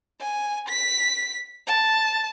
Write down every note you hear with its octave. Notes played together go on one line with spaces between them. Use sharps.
G#5
B6
A5